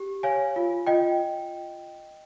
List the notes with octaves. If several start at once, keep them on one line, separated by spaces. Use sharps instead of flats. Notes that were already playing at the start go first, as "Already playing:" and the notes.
Already playing: G4
C#5 F5 G#5
F4
F4 D#5 G5